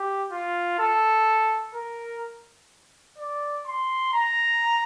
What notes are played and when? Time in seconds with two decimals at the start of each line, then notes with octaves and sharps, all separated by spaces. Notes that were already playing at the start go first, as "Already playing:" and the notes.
Already playing: G4
0.32 F4
0.79 A4
1.74 A#4
3.18 D5
3.66 C6
4.13 A#5